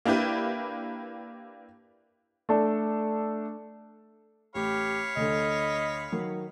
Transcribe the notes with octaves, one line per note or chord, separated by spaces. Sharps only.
A#3 D4 E4 G4 B4
A3 D4 A4
A1 G4 C#5 F5 B5
D2 D3 D#5
D#3 F#3